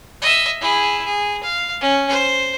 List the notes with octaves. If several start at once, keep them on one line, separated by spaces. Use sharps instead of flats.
D#5 E5
E4 G#4
G#4
F5
C#4
C5